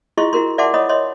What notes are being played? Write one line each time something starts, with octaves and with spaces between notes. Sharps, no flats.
E4 F4 G#4 D#5 C6 C#6
E4 F#4 A#4 C6
D5 E5 F#5 A5 C6 D6
C#5 D#5 B5 D#6
C#5 D#5 C6